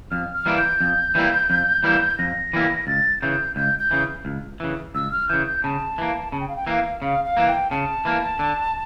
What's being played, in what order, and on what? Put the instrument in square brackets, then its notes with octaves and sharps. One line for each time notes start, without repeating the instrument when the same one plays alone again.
[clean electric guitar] F2 [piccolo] F6
[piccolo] F6
[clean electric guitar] E3 G3 A#3 E4
[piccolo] G6
[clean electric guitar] F2
E3 G3 A#3 E4
F2
E3 G3 A#3 E4
[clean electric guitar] F2 [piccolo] A#6
[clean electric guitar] E3 G3 A#3 E4
[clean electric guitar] C#2 [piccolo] A6
[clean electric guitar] C#3 E3 [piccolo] G6
[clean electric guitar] C#2 [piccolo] G6
[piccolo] G6
[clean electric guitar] C#3 E3
C#2
C#3 E3
[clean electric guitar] C#2 [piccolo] E6
[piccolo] F6
[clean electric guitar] C#3 E3 [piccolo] G6
[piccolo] G6
[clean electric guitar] C#3 [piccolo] A5
[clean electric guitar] E3 A#3
[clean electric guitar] C#3 [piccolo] A5
[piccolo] G5
F5
G5
[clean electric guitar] E3 A#3 [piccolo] F5
[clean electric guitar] C#3 [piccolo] F5
[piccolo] F5
[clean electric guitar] E3 A#3
[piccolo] G5
[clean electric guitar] C#3 [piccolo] A5
[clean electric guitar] E3 A#3
D3